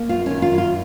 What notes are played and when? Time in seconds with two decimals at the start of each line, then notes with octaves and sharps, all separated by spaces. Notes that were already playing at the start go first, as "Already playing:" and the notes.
Already playing: A#3
0.09 F#2 F4
0.26 D#3 C#4
0.42 F4
0.52 F#2
0.58 F4